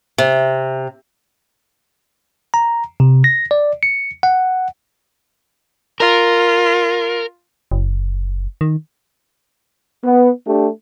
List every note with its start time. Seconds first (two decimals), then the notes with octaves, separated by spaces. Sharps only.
0.18 C3
2.54 A#5
3.00 C3
3.24 A#6
3.51 D5
3.83 C#7
4.23 F#5
6.00 F4 A#4
7.71 F#1
8.61 D#3
10.04 B3
10.46 A3 D4 G4